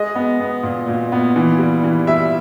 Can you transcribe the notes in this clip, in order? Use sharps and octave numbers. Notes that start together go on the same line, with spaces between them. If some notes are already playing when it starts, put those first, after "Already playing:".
Already playing: G#3 D#5
B3
B3
A#2
A#2
B3
E3
G3
E3
G3 E5